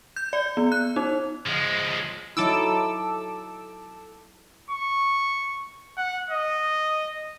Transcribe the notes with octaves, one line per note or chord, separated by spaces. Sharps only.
G6
D5
B3
F#6
D#4
F3 G#3
F#3 D#4 E4 A4 D6 E6
C#6
F#5
D#5